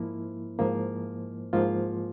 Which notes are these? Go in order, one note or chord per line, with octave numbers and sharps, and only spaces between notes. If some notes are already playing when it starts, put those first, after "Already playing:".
Already playing: G#2 F3 A#3 E4
G#2 F3 A#3
G#2 F3 A#3 F4